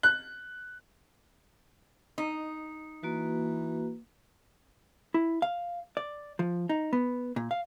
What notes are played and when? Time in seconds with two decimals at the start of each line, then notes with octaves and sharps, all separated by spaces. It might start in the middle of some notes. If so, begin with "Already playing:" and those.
0.03 F#6
2.18 D#4
3.03 E3 A#3 F#4 B4
5.14 E4
5.42 F5
5.97 D5
6.39 F3
6.69 D#4
6.93 B3
7.36 A#2
7.51 F5